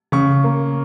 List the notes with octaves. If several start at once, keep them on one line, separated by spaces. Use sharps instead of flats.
C#3 C#6
A#3